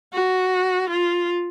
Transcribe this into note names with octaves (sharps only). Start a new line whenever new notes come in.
F#4
F4